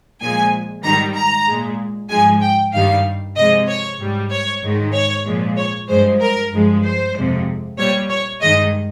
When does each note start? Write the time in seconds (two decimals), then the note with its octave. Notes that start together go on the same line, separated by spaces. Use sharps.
0.21 A#2 F3 G#3 G#5
0.83 G#2 D#3 G3 A#5
1.15 A#5
1.47 A#2 G#3
2.10 G#2 F3 G#3 G#5
2.41 G5
2.73 G2 D#3 G3 F5
3.36 C3 F3 G#3 D#5
3.68 C#5
3.99 G#2 G3
4.31 C#5
4.63 G#2 D#3 G#3
4.94 C#5
5.26 A#2 F3 G#3
5.57 C#5
5.89 G2 F3 G#3 C5
6.21 A#4
6.53 G2 F3 G#3
6.83 C5
7.15 F2 C3 F3 G#3
7.78 A#2 G3 C#5
8.10 C#5
8.41 G2 D#3 G#3 D#5